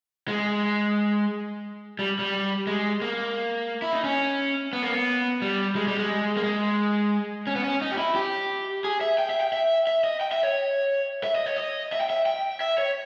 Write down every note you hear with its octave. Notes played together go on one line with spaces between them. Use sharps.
G#3
G3
G3
G#3
A#3
E4
D#4
C#4
B3
A#3
B3
G3
G#3
G3
G#3
A#3
G#3
C#4
B3
C#4
D#4
G4
E4
G4
G#4
E5
G5
E5
G5
E5
E5
D#5
G5
E5
C#5
E5
D#5
C#5
D#5
E5
G5
E5
G5
E5
C#5